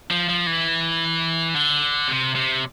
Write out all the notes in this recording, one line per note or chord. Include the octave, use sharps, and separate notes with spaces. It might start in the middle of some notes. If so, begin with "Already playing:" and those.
F3
F3
E3
D3
C3
C3